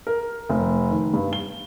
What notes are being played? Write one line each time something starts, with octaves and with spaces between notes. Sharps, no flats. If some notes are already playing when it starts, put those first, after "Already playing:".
A#4
F1
D#3
G2
G7